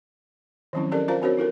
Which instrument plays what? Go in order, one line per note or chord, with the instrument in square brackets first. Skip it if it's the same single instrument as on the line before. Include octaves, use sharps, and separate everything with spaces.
[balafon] D#3 F3 F#3 C4 C#4 E4
C#4 G4 A4 A#4 D5 D#5
F4 A#4 C5 F5 A5 A#5
C4 D4 F#4 A#4 C5 C#5
E4 F4 A4 A#4